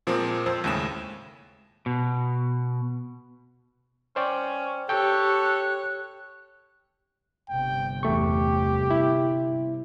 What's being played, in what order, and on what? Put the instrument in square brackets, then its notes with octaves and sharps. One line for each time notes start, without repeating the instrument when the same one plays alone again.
[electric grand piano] A#2 F3 G#3 A#3 C4
F2 C5 E6
D#2 A2 C#3 G#3 G#5 E7
[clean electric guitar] B2
[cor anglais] C#4 [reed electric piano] C5 D5 G5
[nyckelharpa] G4 C#5 [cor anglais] A4 [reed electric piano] G5 C#6 G6 [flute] F#6
[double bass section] G1 C3 [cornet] G5
[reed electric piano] E2 A3 C#6 [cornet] G4
[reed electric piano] E4